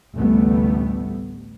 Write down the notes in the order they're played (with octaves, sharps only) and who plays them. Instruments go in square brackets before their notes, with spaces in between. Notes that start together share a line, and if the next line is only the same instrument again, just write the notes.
[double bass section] A1 D2 C3 G3 A3 B3